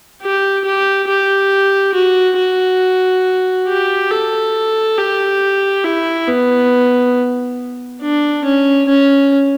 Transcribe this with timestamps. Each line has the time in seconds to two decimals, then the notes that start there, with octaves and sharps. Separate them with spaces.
0.22 G4
0.65 G4
1.08 G4
1.94 F#4
2.38 F#4
3.68 G4
4.11 A4
4.98 G4
5.84 E4
6.27 B3
8.02 D4
8.45 C#4
8.89 C#4